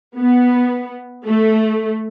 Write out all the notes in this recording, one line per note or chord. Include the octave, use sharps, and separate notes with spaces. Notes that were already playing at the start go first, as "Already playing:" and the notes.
B3
A3